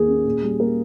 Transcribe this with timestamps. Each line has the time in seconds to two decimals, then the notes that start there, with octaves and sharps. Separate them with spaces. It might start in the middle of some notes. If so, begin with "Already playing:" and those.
Already playing: D#2 D#3 A#3 G#4
0.08 C#4
0.25 A#2
0.42 G3
0.60 A#3 A#4